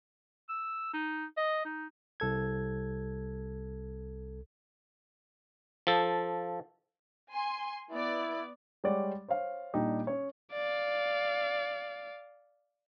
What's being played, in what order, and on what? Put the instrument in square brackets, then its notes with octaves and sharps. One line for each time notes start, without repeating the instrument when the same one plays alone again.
[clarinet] E6
D#4
D#5
D#4
[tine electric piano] C2 A4 G#6
[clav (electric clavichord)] F3 A4
[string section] G#5 C6
[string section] B3 D5 [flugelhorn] E4
[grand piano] G3 G#3 C#5 D5 F#5
C5 C#5 F5
A#2 G3 D4 D#4 G4
C#4 C#5
[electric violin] D5 F5